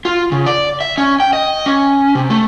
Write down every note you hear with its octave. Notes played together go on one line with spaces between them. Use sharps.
F4
C#3
D5
E5
C#4
G5
D#5
C#4
C3
A3